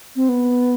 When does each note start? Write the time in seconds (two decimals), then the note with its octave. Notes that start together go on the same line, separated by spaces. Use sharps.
0.16 C4
0.29 B3